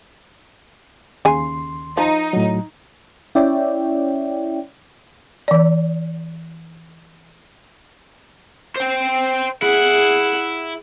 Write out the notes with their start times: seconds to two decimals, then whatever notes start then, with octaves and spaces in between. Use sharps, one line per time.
1.25 D#2 C#3 G#5 C6
1.97 F3 D#4
2.33 A2 F#3
3.35 C#4 E4 C#5 D5 E5 G5
5.48 E3 D5
8.76 C5 G5
9.62 E4 G#4 F#5